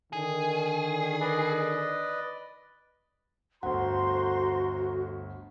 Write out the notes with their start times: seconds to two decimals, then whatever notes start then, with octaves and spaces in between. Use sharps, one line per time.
0.13 D3 D#3 G#4
1.21 B4 D5 D#5
3.63 G1 D2 F#4 C5 F#5 A#5 C6